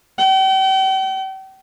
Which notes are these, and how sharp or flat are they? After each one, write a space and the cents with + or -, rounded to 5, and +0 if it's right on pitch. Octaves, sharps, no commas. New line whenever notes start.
G5 -40